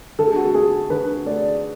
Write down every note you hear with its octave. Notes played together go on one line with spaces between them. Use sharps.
D3 A4
G#4
F#4
G#4
A3 G#4
D3 B4
A3 D5